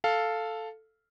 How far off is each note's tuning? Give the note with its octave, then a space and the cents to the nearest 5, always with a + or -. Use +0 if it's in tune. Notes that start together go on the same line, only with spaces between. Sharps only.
A4 +0 F5 +0